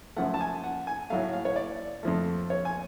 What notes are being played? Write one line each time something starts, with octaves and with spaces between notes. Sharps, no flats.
F#2 F3 A3 F#5
A5
G#5
F#5
G#5
A2 F#3 A3 F5
F5
C#5
D5
F2 F3 A3
C#5
G#5